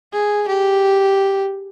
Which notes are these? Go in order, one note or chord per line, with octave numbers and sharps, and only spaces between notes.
G#4
G4